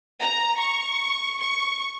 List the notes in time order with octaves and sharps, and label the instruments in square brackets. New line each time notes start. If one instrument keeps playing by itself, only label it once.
[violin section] A#5
C#6
C#6